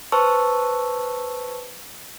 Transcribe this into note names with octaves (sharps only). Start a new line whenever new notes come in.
B4 C5 A5 C#6 E6